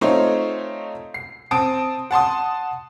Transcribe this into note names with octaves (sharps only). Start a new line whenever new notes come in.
A3 C4 D#4 F4 C5 C#5
C7
C4 A5 D#6 D7
F#5 A5 C6 D#6